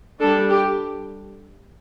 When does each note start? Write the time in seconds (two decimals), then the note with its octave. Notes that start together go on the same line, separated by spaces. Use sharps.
0.20 D4 A4
0.24 G3
0.49 G4